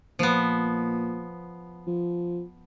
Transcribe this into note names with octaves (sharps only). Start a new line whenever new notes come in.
A#2 F3 B3
F3